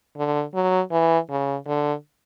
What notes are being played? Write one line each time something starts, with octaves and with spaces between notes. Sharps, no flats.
D3
F#3
E3
C#3
D3